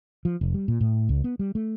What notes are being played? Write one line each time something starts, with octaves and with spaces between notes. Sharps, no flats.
F3
F1
G3
A#2
A2
C#2
B3
G3
A3